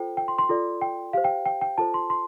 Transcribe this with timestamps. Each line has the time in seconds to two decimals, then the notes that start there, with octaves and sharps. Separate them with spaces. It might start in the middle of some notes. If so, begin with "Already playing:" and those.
Already playing: F4 A4 C5 G5
0.17 G5
0.28 C6
0.38 C6
0.49 F4 A4 D5
0.81 G5
1.13 G4 C5 F5
1.24 G5
1.46 G5
1.61 G5
1.78 F4 A4 C5 A5
1.94 C6
2.10 C6